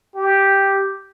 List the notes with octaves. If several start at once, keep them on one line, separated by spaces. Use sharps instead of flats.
G4